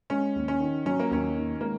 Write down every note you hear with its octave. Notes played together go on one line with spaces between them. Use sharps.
G#3 C#4
D#2
C#4
D#3
F#3 C#4
A#3
D#2 C#4
D#3
G#3 A#3